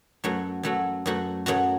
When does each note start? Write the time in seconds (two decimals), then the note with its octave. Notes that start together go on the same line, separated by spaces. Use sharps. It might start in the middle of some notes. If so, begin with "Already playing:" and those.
0.24 F#2 F#3 A3 F#4
0.63 F#2 F#3 A3 F#4
1.06 F#2 F#3 A3 F#4
1.46 F#2 F#3 A3 F#4